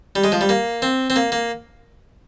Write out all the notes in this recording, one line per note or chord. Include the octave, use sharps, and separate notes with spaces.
G3
G#3
F3
G3
A#3
C4
C4
A#3
A#3